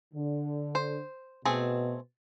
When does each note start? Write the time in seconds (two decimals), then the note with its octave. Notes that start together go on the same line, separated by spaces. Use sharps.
0.14 D3
0.75 C5
1.45 B2 A3 C4 G#4